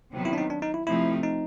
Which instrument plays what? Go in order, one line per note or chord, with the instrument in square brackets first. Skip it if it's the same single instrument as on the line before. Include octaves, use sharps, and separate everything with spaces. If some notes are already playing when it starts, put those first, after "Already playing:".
[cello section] C3 D#3 F#3 B3
[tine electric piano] E4
D4
D#4
D4
D#4
E4
[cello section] C3 F3 A3 C4 D#4 [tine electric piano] E4
[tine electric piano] D#4